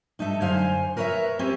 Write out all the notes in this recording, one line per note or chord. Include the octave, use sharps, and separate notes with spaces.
G2 D#4 A4 E5
F#2 D3 C5 F5 G#5
A#4 B4 C#5 D#5 E5
C4 C#4 G4 G#4